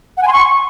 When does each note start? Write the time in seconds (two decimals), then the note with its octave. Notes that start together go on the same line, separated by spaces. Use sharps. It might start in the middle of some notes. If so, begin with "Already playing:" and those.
0.17 F#5
0.22 G#5
0.28 C6
0.33 C#6